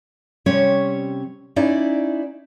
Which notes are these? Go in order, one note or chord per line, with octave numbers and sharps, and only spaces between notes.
C3 G3 C4 C#4 C#5
C#4 D#4 E4 D5